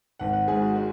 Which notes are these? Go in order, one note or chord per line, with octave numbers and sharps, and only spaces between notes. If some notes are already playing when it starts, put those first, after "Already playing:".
G#1 F#5
F#5
G#2 G#4
F#4
G#3 F#4